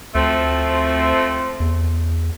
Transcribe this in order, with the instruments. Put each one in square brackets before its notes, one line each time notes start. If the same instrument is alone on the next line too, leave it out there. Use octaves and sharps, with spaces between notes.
[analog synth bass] D2 [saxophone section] F3 A3 C4
[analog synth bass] E2